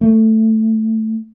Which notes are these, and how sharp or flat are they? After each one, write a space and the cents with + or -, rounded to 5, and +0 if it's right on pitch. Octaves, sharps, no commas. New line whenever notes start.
A3 +5